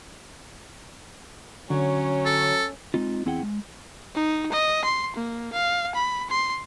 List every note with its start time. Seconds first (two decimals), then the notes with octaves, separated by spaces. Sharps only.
1.70 D3 F#3 C#4
2.26 A4
2.94 G#3 C4 D#4 F4
3.26 E2 C4 E4 G#4 F#5 G5
3.43 G#3
4.15 D#4
4.52 D#5
4.84 C6
5.16 A#3
5.53 F5
5.95 B5
6.30 C6